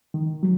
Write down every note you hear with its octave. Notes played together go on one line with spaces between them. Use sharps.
D#3
F#3